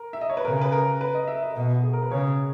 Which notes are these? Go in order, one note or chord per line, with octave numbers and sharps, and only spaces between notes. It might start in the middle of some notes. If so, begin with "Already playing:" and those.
Already playing: A#4
E5
D#5
C#5
B4
C#3 A#4
B4
A#4
B4
D#5
E5
D#5
B2 D#5
F#4
G#4
A#4
B4
C#3 C#5